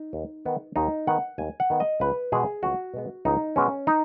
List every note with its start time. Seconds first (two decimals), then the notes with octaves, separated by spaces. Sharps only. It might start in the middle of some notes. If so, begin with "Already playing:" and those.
Already playing: D#4
0.13 D#2
0.45 D#3 B3
0.76 D#2 D#4
1.07 D#3 B3 F#5
1.38 D#2 G#5
1.60 F#5
1.70 D#3 B3
1.80 D#5
2.00 C#2 B4
2.32 B2 G#3 B3 G#4
2.63 C#2 F#4
2.94 B2 G#3 B3
3.25 C#2 D#4
3.56 B2 G#3 B3 C#4
3.87 D#4